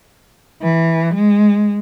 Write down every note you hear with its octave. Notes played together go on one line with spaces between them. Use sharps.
E3
G#3